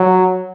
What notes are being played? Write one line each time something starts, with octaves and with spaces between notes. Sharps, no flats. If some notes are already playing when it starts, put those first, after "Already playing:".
Already playing: F#3